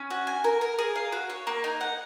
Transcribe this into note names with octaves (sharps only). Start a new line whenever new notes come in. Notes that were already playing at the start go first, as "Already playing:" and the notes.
Already playing: C#4
F#4
G#5
A#4
A#4
G#4
F5
F#4
C#5
A#3
D#4
F#5